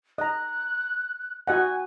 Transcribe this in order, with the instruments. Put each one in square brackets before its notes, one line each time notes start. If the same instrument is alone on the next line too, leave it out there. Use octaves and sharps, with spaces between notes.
[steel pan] D#5 A#5 [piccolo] F#6
[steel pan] F#4 D#5 F#5 [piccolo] G#5